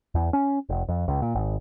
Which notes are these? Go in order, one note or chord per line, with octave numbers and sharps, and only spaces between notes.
E2
C#4
F1
F2
C#2
A#2
G#1